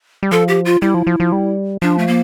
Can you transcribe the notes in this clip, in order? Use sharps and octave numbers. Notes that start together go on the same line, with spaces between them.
G3
F3 A4
G4
F4
G3 E4
F3
F3
F3
G3
F3 D4
A3
A#3